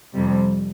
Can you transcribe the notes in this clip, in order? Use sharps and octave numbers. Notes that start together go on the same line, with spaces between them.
F2 C3 G3